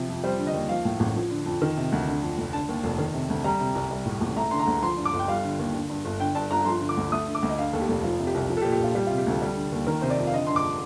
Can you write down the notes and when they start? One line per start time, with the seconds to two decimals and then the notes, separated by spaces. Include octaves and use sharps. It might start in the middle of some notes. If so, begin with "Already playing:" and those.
Already playing: C3 F3
0.09 F2
0.24 G3 C5
0.39 D3
0.47 D#5
0.54 D#2
0.69 F3 F5
0.85 A2
1.00 A1
1.16 F3
1.31 D3
1.46 F2
1.62 D#3
1.77 C3
1.92 D2
2.08 D3
2.22 F2
2.38 F1
2.53 D3 A5
2.69 D#2
2.84 F1
2.98 D#3
3.14 C3
3.29 D2
3.44 G3 A#5
3.60 C3
3.75 C2
3.91 G3
4.06 A2
4.21 A1
4.37 A3 A#5
4.51 D3 C6
4.59 A#5
4.67 D2
4.82 F3 C6
4.97 G2
5.05 D6
5.13 G1
5.19 G5
5.28 G3 F5
5.44 D3
5.59 D#2
5.74 D3
5.90 G2
6.04 G1
6.20 D3 G5
6.35 G2 A5
6.51 G1 A#5
6.66 F3 C6
6.81 D3
6.89 D6
6.97 D2
7.12 A3 D#6
7.27 D3
7.35 D6
7.43 D2
7.49 D#5
7.58 D3 F5
7.73 D#2 A4
7.81 G4
7.88 F1
8.04 F3 F4
8.20 C3
8.27 G4
8.34 C2
8.49 F3
8.57 A4
8.62 G4
8.65 A#2
8.72 G4
8.80 A#1 F4
8.95 G3 G4
9.07 C3 F4
9.18 G4
9.26 D2 A4
9.42 G3
9.56 D3
9.72 D#2
9.87 D#3 A#4
10.02 C3 C5
10.10 D5
10.18 F2
10.27 F5
10.34 D3 D#5
10.47 G2 C6
10.56 D6